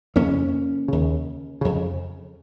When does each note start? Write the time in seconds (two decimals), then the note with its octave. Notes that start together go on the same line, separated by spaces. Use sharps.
0.16 F2 C#3 A#3 C#4
0.88 D#2 C#3
1.61 F2 C#3